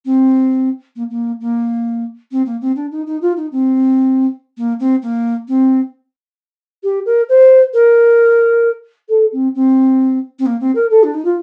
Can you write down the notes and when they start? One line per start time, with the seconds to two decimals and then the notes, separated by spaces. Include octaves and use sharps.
0.05 C4
0.95 A#3
1.10 A#3
1.40 A#3
2.31 C4
2.46 A#3
2.61 C4
2.76 D4
2.91 D#4
3.06 D#4
3.21 F4
3.36 D#4
3.52 C4
4.57 A#3
4.79 C4
5.02 A#3
5.48 C4
6.83 G4
7.06 A#4
7.29 C5
7.74 A#4
9.09 A4
9.32 C4
9.55 C4
10.39 C4
10.46 A#3
10.60 C4
10.75 A#4
10.90 A4
11.03 D4
11.14 D#4
11.25 F4